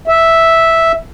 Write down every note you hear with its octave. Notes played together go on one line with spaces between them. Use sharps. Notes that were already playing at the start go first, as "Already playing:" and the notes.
E5